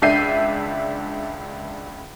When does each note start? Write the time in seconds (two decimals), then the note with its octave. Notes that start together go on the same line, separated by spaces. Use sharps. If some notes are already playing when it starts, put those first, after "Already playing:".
0.02 C#2 D4 E5 G6 C7 D#7